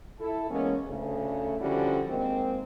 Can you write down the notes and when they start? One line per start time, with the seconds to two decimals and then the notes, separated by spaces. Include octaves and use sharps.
0.19 E4 A4
0.50 E3 G#3 A#3 B3 C#4
0.88 D2 C#3 A3
1.59 D3 F3 G3 C#4 E4 F#4
2.08 D#3 G#3 A#3 C4